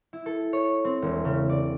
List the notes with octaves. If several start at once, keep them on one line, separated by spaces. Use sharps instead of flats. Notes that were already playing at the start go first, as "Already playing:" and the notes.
E4
A4
C#5
C4
E1
C#3
D5